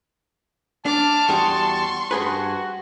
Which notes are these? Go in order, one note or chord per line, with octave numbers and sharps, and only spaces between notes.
D4 A5 D6 F6
E2 G3 F#4 C6 C#6
G2 F#4 G#4 B4